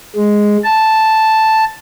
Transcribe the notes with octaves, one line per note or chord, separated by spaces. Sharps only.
G#3
A5